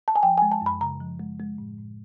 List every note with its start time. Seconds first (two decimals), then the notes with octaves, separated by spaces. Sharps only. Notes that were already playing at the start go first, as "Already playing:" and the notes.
0.08 A5
0.16 G#5
0.23 F3 G5
0.38 G#3 G#5
0.52 A5
0.61 F#2 B5
0.81 C#3 A#5
1.00 F3
1.19 G#3
1.40 G#3
1.58 A2
1.78 A2